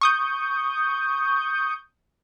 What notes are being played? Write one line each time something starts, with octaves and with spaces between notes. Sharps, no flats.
C#6 D#6 G6